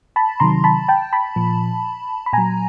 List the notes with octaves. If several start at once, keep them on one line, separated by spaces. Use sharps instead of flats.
A5 B5
C3 D#3 F#3 A#5 C6
A5 B5
G5 A5
A5 B5
A#2 F3
B5
A#2 F#3 G#5 A#5